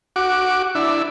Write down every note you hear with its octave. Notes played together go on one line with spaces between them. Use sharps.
F#4 D6
D4 E4